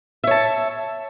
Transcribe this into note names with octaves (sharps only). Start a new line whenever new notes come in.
C#5 E5 A5